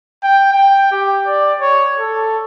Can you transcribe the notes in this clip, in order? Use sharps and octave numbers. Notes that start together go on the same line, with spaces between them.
G5
G5
G4
D5
C#5
A4